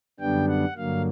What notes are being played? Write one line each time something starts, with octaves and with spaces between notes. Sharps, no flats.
F#2 D3 G3 B3 D4 G5
F#5
G2 D3 F#3 A#3 F5